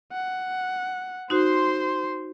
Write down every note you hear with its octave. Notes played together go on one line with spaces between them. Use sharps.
F#5
D#4 F#4 C5 C6